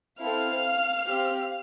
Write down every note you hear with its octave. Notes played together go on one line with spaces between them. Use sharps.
C4 E4 A4 F5 F6
C4 G4